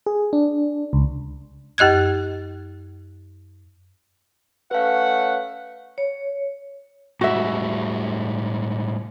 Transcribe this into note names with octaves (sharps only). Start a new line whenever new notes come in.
G#4
D4
C#2
F#2 G4 D#5 F#6 G#6
A3 C#4 B4 F5 F#5
C#5
A2 G3 G#3 F#4 E5